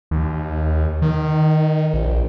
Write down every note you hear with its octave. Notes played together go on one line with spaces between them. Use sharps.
D#2
D#3
A#1